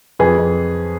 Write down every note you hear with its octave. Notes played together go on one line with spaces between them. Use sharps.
F2 G#4 B4
F2